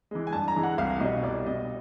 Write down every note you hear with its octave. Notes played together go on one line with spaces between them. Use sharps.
E3 G#3
G#5
G2 A5
A#5
E3 G#3
F#5
C2 F5
B2 G3 D#5
C2 D5
B2 G3 D#5